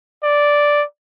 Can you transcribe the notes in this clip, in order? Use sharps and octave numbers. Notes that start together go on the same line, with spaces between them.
D5